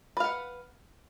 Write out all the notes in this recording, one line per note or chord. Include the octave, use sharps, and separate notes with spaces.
B4 F5 F#5